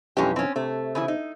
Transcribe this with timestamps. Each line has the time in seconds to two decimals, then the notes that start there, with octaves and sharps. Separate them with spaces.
0.17 B1 F2 E3 G#3 C#4 G4
0.36 C4 C#4
0.56 C3 A3
0.95 C#3 E3 E4
1.08 D#4